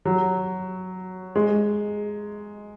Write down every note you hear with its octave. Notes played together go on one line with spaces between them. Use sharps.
F#3
G#3